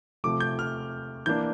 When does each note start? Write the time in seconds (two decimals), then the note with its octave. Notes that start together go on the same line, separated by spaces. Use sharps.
0.24 C3 F3 A3 D6
0.40 G6
0.59 F6
1.26 E3 A#3 D4 G6